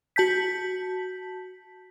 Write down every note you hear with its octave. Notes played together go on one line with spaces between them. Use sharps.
F#4 A5 G6 B6